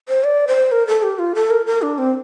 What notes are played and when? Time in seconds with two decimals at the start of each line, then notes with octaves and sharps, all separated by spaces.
0.09 C5
0.24 D5
0.48 C5
0.72 A#4
0.87 A4
1.03 G4
1.19 F4
1.35 A4
1.50 A#4
1.66 A#4
1.82 D4
1.98 C4